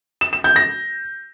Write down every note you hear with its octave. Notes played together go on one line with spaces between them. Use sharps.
E7
E7
G6
A#6